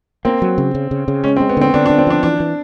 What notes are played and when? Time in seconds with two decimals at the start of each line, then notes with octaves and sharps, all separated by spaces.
0.25 A#3 C4
0.42 F#3
0.58 C#3
0.75 C#3
0.91 C#3
1.08 C#3
1.24 G#3 C#4
1.36 C4
1.41 G#3
1.49 B3
1.57 D3 C4
1.74 D3 D4
1.86 D4
1.90 D3
1.98 C4
2.07 F3 D4
2.23 E3 D4
2.40 E3